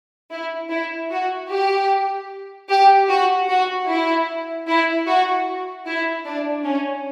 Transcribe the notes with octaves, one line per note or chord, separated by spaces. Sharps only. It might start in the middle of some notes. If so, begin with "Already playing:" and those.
E4
E4
F#4
G4
G4
F#4
F#4
E4
E4
F#4
E4
D4
C#4